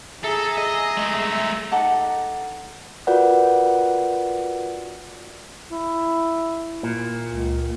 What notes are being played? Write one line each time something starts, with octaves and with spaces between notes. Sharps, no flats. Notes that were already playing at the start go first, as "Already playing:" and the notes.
G#4 A4 E5 A#5
D#5
G#3 A3
D#4 A4 F#5 D6
F4 F#4 A#4 B4 D5 F#5
E4
A#2
C#2